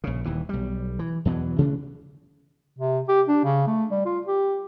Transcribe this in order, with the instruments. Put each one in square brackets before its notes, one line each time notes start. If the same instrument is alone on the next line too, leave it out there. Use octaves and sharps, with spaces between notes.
[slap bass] A#1 C#3
D#1 D#2 E3
B1 G3
E3
E2 B2 E3 F#3
C3 E3 A3 D4
[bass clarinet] C3
G4
D4
C#3
A3
G3
F4
G4